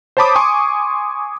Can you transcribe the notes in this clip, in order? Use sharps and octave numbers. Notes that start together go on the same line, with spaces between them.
C5 C#5 A5 B5 D6 D#6
G#5 C6 C#6 D#6